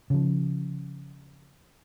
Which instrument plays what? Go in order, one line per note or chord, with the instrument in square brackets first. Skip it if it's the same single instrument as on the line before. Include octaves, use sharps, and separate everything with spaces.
[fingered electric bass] C#3 F3